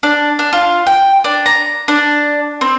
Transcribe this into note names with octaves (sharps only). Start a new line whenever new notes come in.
D4
D4
F4
G5
D4
A#5
D4
C4